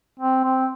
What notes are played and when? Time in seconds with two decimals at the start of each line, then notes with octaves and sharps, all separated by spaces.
0.19 C4
0.44 C4